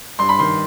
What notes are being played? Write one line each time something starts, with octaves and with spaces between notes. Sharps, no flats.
G2 C6
B5
D#3 C6